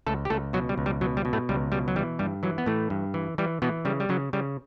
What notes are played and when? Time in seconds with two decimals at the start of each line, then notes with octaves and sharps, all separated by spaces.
0.07 C#2 A3 A4
0.25 G4
0.30 C#2 A3 A4
0.53 B2 F#3 F#4
0.69 G3
0.78 C#2
0.86 G3
1.01 B2 F#3
1.17 G3
1.25 B2
1.33 A2 A3
1.49 C#2 G3
1.72 B2 G3
1.88 F#3
1.96 E3 G3
2.19 G2 G3
2.43 E3 F#3
2.58 B3
2.66 A2 E3 A3
2.90 G2
3.14 E3
3.38 E3 G3
3.62 B2 E3 B3
3.85 C#3 G3
4.00 G3
4.09 C#3 F#3
4.33 C#3 G3